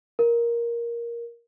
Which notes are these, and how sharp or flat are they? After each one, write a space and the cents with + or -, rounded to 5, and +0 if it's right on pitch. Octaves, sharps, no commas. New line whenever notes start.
A#4 +10